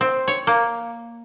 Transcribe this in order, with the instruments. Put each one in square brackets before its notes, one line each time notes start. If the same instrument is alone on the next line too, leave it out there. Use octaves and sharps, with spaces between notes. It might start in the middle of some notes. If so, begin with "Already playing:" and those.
[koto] C4
C#5
A#3